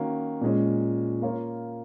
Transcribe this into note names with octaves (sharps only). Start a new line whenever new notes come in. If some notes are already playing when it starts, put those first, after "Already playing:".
Already playing: D#3 A#3 C#4 F#4
A#2 G#3 C#4
A#3 F4 A#4 C#5